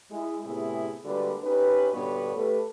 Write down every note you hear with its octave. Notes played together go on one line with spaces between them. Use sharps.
G#3 E4 G#4
A2 C3 B3 E4 G#4
D3 G3 G#3 A#3 F#4 B4
C#4 D#4 G4 B4
G2 A#2 D3 B3 F#4 C#5
A3 G4 A4 B4